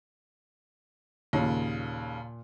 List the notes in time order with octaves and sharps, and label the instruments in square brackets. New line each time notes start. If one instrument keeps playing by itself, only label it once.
[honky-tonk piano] D#2 C#3 [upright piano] A#2